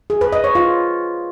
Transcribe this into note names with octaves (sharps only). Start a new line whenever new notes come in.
G#4
B4
D#5
C#5
F4